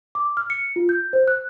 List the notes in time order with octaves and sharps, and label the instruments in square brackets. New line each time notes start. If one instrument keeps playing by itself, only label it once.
[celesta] D6
F6
C#7
F4
G6
C5
F#6